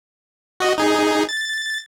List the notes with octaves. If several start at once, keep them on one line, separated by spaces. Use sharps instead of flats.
F#4 D#5
D#4 G#4
A6